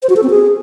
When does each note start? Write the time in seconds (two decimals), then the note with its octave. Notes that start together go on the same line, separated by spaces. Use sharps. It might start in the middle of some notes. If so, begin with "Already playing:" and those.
0.03 C5
0.09 F#4
0.16 A4
0.23 C4
0.30 G#4